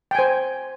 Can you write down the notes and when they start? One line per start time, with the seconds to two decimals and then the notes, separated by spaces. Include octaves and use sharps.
0.11 G5
0.15 G#5
0.19 C5